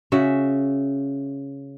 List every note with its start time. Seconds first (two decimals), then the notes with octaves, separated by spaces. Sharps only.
0.12 C#3 F#4 E5